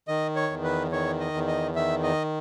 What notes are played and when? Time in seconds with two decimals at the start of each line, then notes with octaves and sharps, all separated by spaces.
0.08 D#3 D#5
0.36 C#5
0.50 E2
0.64 B4
0.92 D#3 C#5
1.20 D#5
1.34 E2
1.48 D#5
1.76 D#3 E5
2.03 D#5